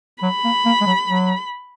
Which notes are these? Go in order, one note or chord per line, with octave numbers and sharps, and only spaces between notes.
F#3 B5
A#3
A#3
G#3
F#3
F#3